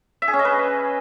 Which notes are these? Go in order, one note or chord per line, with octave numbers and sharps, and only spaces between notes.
E5
G#4
C#4
D#5
B4